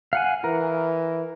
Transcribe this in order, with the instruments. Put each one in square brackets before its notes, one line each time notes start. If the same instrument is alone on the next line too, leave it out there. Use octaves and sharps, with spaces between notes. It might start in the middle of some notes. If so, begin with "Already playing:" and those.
[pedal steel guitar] F5 F#5 G#5
[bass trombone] E3 [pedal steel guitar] A#4